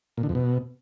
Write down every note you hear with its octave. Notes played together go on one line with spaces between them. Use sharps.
A#2
D3
F2
B2